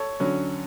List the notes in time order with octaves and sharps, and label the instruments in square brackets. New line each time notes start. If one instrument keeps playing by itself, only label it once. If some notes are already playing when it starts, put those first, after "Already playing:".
Already playing: [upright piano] A4 C#5
[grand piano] D3 F#3 C#4